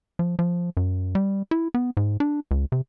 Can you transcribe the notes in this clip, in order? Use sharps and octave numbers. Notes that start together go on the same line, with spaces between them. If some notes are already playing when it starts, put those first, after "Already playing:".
F3
F3
F#2
G3
E4
B3
G#2
D4
C#2
C3